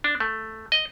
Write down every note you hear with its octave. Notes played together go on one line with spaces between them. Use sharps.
D4
A3
D#5